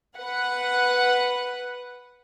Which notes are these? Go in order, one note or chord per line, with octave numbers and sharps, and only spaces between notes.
B4 F#5